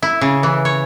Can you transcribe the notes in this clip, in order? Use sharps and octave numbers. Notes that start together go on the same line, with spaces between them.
E4
C#3
E3
C#5